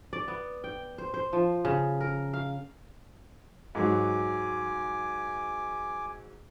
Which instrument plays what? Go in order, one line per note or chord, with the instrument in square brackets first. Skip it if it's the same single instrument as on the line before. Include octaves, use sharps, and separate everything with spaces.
[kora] D5
B3
G5
C5
C5
F3
C#3
A#4
F5
[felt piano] G#2 F#3 [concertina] G#5 D6